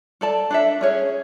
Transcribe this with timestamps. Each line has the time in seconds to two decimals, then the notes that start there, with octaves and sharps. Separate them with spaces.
0.21 A4 D5 A5
0.50 D4 A4 E5
0.81 C#4 G#4 C#5